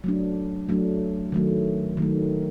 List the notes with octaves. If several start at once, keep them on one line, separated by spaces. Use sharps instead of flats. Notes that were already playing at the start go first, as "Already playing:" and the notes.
F#3 A3 D4
F#3 A3 D4
D#3 F#3 A3
D#3 F#3 A3